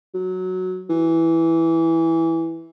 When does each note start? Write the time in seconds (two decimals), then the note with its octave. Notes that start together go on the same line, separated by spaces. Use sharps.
0.14 F#3
0.90 E3